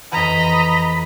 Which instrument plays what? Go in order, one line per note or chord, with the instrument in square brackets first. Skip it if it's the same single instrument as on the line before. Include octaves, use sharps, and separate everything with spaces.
[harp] F2 E3 [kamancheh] D#5 A#5 [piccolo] B5